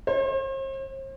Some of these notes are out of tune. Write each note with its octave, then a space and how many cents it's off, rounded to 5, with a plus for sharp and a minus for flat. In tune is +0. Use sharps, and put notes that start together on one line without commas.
C5 +45